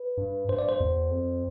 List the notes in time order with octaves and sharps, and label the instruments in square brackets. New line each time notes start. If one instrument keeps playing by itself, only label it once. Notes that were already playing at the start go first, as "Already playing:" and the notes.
Already playing: [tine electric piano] B4
[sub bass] G2
[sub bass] G2 [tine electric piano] C5
[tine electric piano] D5
C5
[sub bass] E2
F2